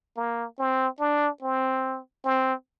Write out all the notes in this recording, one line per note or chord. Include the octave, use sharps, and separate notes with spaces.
A#3
C4
D4
C4
C4